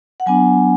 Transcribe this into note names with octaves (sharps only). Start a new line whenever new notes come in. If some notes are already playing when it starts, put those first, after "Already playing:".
F#5
F#3 B3 D4 G#5